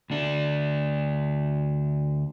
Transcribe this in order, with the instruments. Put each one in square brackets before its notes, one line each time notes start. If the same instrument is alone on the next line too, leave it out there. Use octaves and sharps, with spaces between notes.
[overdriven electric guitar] D2 D4